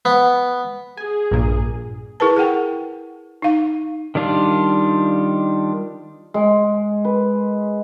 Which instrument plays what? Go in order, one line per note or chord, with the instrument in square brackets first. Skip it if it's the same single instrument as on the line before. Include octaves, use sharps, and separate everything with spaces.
[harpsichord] B3
[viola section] G#4 [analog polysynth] G#5
[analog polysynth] A#1 G2 A#2
[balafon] E4 G#4 A#4 B4 A5
G#4 A#4 F#5 G5
D#4 F5
[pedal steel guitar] D#3 G3 D4 F4
[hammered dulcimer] G#3
B4